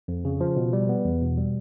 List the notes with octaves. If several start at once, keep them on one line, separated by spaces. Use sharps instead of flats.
F2
C#3
F3
B2
G3
B3
E2
B2
G3